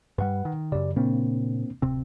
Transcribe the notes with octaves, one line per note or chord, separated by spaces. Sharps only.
G2 G3 B4 F#5
D#3
F#2 C#3 G4 D5
A#2 C#3 A#3 C4 D4
D1 C3 C4